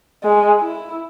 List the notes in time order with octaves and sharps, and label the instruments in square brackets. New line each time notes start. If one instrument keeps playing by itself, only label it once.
[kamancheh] G#3
E4